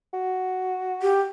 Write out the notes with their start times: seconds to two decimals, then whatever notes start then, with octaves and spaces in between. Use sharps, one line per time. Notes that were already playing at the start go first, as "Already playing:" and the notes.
0.14 F#4
1.02 G4